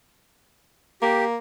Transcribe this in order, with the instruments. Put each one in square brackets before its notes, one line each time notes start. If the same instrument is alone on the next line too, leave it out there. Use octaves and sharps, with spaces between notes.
[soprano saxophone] A#3 [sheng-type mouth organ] G4